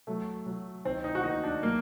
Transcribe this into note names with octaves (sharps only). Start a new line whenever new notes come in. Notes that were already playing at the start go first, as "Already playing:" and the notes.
F#3 A3
F#3
D#3 C4
D#4
F#4
D#2 D#4
D4
F#3 A#3